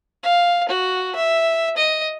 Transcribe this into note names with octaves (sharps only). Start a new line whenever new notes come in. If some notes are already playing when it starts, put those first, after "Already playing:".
F5
F#4
E5
D#5